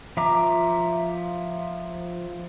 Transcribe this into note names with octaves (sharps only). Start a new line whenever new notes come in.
F3 E5 A#5 D6